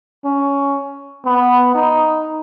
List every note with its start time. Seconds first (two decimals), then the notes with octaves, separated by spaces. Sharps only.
0.24 C#4
1.25 B3
1.75 D#4